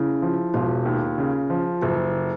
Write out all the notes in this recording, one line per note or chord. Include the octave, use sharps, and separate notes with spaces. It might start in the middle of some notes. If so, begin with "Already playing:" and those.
Already playing: C#3 E4
F3
E1 F4
D#2
C#3
F3
F#1 A4